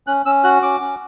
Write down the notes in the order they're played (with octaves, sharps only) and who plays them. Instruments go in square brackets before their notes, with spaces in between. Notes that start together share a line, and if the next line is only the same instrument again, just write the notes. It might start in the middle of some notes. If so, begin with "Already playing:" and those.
[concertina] C#4 F#6
C#4 E6
F#4 F#6
C#4 D6
C#4